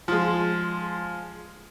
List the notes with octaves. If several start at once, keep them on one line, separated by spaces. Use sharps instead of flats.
F3 G#3